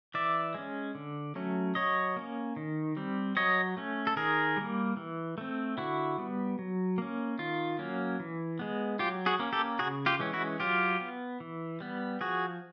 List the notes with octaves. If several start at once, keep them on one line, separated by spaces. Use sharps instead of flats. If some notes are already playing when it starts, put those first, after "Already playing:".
E3 D5 E5
G#3 C#4
D3
F#3 A3 C#4
F#3 C#5 D#5
A#3 C#4
D#3
G3 C4
F#3 C#5 D#5
A3 C#4
A4
D#3 G#4 A#4
G3 A#3
E3
A3 C4
D3 E4 F#4
G3 B3
F#3
A#3 C#4
D#3 F4
F#3 A#3 C#4
E3
G#3 B3
F#3 F4 G4
F#4 G#4
A#3 C#4
G4 A4
C#3 F#4 G#4
F4 G4
E3 G#3 C#4
E4 F#4
F#3 F4 G4
B3
E3
G3 B3
F3 F#4 G#4